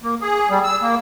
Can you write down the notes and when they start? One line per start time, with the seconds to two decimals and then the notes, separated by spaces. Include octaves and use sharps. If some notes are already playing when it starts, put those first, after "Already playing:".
0.03 A#3
0.21 G#4
0.50 G3
0.64 E6
0.82 A#3